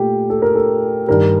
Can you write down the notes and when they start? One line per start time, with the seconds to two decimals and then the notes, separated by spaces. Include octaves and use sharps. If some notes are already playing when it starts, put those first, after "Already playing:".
Already playing: A#2 A3 G4
0.30 A4
0.42 A#4
0.55 A4
1.07 G2 D#3 G3 A#4